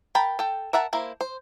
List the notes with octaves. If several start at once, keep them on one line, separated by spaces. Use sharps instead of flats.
A#4 G5 A5 B5
A4 G5
A#4 E5 F#5 A5
A#3 E4 C5
C5